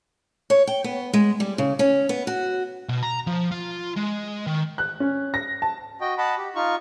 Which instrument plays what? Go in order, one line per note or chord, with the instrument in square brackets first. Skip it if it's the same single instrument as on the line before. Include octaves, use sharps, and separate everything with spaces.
[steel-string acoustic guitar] C#5
G5
B3
G#3
G3
C#3
C#4
B3
F#4
[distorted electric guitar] B2
A#5
F3
F4
G#3
D#3
[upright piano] F#6
C#4
A#6
A5
[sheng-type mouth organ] F#4 D#5 G5
D#5 F#5 A5 B5
G4
D#4 F4 C#6